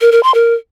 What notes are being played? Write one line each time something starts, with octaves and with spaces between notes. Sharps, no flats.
A#4
A#4
C6
A#4